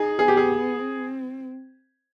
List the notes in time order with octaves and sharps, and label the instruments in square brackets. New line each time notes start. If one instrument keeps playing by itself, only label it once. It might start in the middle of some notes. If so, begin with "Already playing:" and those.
Already playing: [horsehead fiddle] D#4 [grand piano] G#4
[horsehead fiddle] B3 [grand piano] G#4
[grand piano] G4
G#4
[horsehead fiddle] C4